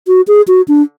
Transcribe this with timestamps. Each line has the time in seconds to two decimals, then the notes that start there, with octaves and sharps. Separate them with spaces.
0.07 F#4
0.28 G#4
0.48 F#4
0.68 D4